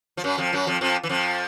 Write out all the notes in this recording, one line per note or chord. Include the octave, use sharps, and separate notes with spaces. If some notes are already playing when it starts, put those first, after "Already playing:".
F3
F#2 F#3
F2 F3
F#2 F#3
F2 F3
F2 F3
E3
F2 F3